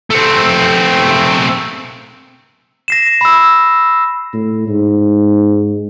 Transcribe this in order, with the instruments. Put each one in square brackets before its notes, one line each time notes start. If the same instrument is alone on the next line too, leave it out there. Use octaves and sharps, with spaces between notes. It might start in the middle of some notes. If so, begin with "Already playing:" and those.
[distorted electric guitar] A3 C4
[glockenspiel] A#6 C7 E7
B5 E6
[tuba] A2
G#2